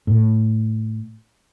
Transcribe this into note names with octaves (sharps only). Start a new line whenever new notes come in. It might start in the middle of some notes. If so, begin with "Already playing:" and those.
A2